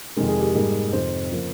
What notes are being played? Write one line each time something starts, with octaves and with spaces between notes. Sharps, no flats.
F2 C3 D#3 G#3 A#4
G#4
G4
G#2 G3 A#3 G#4
F2 C3 D#3 C5
C#3 F3 A#3